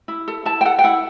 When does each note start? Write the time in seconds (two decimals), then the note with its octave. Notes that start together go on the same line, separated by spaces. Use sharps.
0.08 E4
0.28 A4
0.45 E4 A5
0.61 G5
0.65 A4 F#5
0.79 G5
0.84 E4 F#5